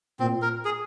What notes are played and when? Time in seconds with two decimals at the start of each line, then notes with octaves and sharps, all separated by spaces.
0.20 A#2 C4
0.42 A#4
0.65 G#4